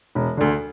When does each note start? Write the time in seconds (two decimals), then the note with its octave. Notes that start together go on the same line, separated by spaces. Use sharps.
0.15 E1
0.37 D2 D3